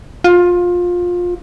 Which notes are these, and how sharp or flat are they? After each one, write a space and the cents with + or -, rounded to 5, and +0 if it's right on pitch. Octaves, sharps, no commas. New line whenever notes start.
F4 +20